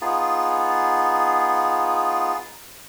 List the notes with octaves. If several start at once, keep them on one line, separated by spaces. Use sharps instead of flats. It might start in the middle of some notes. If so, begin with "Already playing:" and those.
B3 D#4 F4 G#4